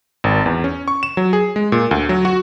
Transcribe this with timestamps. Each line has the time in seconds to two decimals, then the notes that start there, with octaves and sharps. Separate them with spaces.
0.24 G#1
0.46 E2
0.64 C#4
0.88 C#6
1.03 E7
1.17 F#3
1.33 G#4
1.56 G#3
1.72 A#2
1.91 D2
2.09 F#3
2.25 F#4